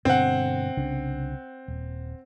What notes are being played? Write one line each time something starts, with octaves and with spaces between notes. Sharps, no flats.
G2 B2 D3 C4 F#5
C2 C#3 D4
D#1